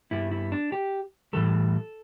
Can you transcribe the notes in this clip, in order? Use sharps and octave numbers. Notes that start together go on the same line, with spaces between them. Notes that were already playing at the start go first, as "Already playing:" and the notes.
G2 G3 B3 E4
E4
D4
G4
A2 E3 G3 A4